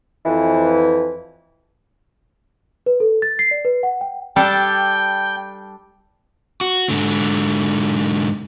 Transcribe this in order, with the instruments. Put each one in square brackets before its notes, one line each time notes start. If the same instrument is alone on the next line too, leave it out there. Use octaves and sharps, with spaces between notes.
[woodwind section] F2 E3
[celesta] B4
A4
A6
C7
D5
B4
F#5
G5
[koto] G3 D4 A4 [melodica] G5
[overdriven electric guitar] F#4
G#2 D3